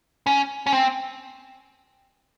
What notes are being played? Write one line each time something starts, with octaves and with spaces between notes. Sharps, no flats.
C#4
C#4
C4